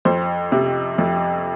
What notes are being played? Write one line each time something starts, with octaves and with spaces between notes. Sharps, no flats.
F2 C5
C3
F2